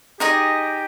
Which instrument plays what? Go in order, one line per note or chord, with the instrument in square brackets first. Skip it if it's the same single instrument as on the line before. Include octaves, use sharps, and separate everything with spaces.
[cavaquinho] D#4 G#4 D#5 [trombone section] G4